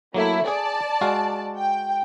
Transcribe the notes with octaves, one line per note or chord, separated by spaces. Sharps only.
F#3 A3 A#3 E4
G#4 D5 A5
G#3 F#4 F5
G5